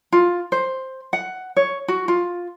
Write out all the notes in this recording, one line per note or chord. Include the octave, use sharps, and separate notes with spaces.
F4
C5
F#5
C#5
F#4
F4